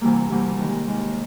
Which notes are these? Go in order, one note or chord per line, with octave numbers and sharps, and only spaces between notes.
D2 C3 E3 G3 A#3
D2 C3 E3 G3 A#3
D#2 D#3 G#3
D#2 D#3 G#3